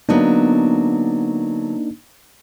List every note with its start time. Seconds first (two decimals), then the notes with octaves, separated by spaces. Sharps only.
0.09 D3 F#3 A#3 B3 D4 D#4